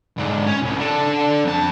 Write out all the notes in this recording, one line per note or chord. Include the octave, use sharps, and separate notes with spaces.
G#2 D3
C#4 C#5
C2
D4 A4
F2 A5